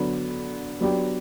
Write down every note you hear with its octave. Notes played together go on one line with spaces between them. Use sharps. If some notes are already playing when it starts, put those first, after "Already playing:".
Already playing: D3 F#3 B3 D4
F#3 B3 D4 G4